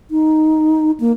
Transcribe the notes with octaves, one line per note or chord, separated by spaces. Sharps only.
D#4
A#3